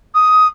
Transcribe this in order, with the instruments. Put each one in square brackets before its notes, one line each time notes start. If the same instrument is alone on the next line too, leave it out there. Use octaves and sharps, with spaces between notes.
[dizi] D#6